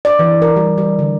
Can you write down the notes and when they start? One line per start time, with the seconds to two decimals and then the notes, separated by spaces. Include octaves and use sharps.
0.05 D5
0.19 E3
0.42 A#4
0.56 G3
0.78 G3
0.99 D3